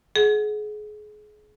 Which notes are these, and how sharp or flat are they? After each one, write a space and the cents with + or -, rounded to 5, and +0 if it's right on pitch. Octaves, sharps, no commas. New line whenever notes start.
G#4 +30 F#5 +0